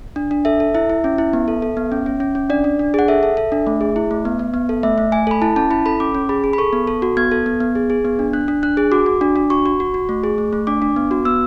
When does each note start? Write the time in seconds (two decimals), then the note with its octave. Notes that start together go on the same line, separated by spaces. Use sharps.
0.16 D4
0.31 D4
0.45 A4 E5
0.60 A4
0.75 E4 E5
0.89 E4
1.04 C#4
1.18 E4
1.33 B3
1.48 A4
1.62 A4
1.77 B3
1.92 C#4
2.06 C#4
2.20 C#4
2.35 C#4
2.50 D4 D5
2.64 D4
2.79 D4
2.94 G#4 F#5
3.08 A4 E5
3.23 A4
3.37 A4
3.52 D4
3.67 A3
3.81 G#4
3.96 E4
4.11 A3
4.25 B3
4.39 B3
4.54 B3
4.69 A4
4.83 A3 E5
4.98 A3
5.12 A3 G#5
5.27 A4 B5
5.42 E4 A5
5.56 C#4 A5
5.71 E4 B5
5.86 A4 B5
6.00 C#4 D6
6.15 C#4
6.29 G#4 B5
6.44 G#4
6.53 B5
6.58 A4 C#6
6.73 B3
6.87 A4
7.02 F#4
7.17 B3 G#6
7.31 A4
7.46 B3
7.60 B3
7.75 G#4
7.90 G#4
8.05 B3
8.19 D4
8.33 D4 F#6
8.48 D4
8.63 D4 F#6
8.77 G#4
8.92 F#4 D6
9.06 F#4
9.21 D4
9.36 D4
9.50 F#4 C#6
9.66 F#4
9.80 F#4
9.94 F#4
10.09 A3
10.24 G#4
10.38 A3
10.53 A3
10.67 D4 D6
10.82 D4
10.96 B3
11.11 F#4
11.25 B3 E6